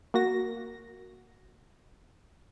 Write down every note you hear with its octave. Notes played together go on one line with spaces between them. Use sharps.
A#3 F#4 A#6